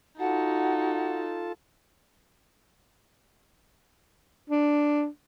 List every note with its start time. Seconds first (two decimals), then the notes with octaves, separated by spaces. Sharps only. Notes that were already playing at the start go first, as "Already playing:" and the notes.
0.19 D#4 F4 F#4 A4 F#5 A5
4.50 D4